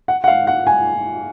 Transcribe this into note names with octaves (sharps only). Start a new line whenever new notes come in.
F#5
F#5
F5
F#5
G#5